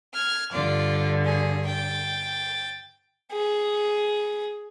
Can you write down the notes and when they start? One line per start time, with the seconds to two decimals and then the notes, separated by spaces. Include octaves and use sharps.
0.13 F6 G#6
0.52 G2 D3 F4 D5
1.25 G#4
1.66 G5 A6
3.32 G#4